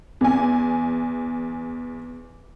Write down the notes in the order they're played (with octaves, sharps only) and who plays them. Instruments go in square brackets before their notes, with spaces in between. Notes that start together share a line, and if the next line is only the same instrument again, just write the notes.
[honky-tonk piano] E2 G#5